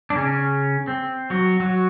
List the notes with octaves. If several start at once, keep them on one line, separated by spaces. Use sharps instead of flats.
D4
C#3 C#4
C4
F#3 F#4
F#3 F#4